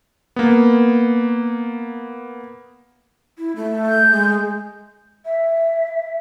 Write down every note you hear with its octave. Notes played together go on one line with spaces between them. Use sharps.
A#3 B3
E4
A3
G6
G#3
E5